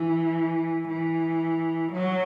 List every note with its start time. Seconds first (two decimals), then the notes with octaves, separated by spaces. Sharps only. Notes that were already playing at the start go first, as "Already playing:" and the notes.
Already playing: E3
0.88 E3
1.92 F#3